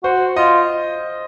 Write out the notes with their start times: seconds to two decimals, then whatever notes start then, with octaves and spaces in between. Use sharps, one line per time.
0.04 F#4 C5
0.36 F4 D#5